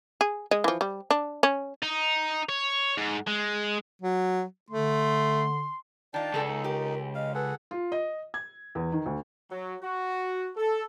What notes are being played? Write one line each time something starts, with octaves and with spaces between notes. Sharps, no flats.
G#4
G#3 D#5
E3 F3
G3
D4
C#4
D#4
C#5
G#2
G#3
F#3
D3 A3 C6
D#3 D4 F4 D5 G5 A5
C#2 G#4 A4
D#4
G4 A#4
D#5 F5
G#4 A4 B4 F#5
F4
D#5
G#6
E2
D#3
D2
F#3
F#4
A4